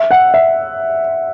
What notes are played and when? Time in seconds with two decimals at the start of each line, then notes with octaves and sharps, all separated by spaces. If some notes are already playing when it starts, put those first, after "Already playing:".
Already playing: E5
0.11 F#5
0.34 E5